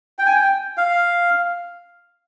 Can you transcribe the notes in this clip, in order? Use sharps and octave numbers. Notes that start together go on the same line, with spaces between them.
G5
G#5
G5
F5